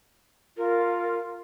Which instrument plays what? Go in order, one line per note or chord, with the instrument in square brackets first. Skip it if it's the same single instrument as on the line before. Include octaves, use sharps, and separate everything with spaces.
[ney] F4 [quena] A#4